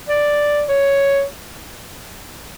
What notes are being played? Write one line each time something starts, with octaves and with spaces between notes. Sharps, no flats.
D5
C#5